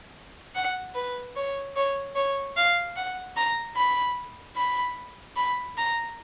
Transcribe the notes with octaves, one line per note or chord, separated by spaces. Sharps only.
F#5
B4
C#5
C#5
C#5
F5
F#5
A#5
B5
B5
B5
A#5